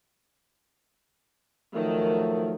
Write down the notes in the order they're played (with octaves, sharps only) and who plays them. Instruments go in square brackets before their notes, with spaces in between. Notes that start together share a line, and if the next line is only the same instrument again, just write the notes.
[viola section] D#3 [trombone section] F3 F#3 A3